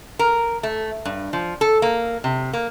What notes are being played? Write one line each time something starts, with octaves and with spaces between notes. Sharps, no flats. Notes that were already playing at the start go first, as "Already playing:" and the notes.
A#4
A3
G2
F3
A4
A#3
C3
A#3